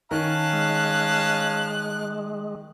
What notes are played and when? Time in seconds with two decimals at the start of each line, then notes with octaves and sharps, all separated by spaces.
0.11 D#3 C#4 F5 A5 F#6
0.53 G#3